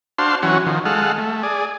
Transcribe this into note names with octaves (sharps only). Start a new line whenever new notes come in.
D4 F#4 C5 F5 A5 C6
E3 F#3 C#4 F#4
D#3 F3
G#3 A4 F5 F#5
A3
G#4 D5